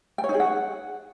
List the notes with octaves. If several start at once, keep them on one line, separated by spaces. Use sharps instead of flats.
G5
C#5
D#4
G#4
F#5